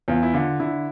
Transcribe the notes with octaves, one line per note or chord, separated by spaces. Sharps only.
E2 F4
E4
D3 F4
D3 E4